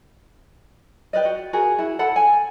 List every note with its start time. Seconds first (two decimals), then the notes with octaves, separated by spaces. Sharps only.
1.13 G4 B4 D5 D#5
1.25 F#4
1.53 F#4 G#4 A#4 G#5
1.79 E4 F#4
1.99 A4 F#5 A5 B5
2.16 G#5